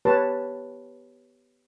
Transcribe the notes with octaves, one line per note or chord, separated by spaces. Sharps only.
B3 G4 B4 C#5 A5